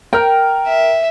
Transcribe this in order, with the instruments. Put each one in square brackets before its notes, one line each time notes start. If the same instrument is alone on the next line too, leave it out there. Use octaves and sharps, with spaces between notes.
[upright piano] A#4 F6 [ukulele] G5
[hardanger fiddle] E5